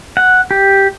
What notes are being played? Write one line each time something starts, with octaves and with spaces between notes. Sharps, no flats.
F#5
G4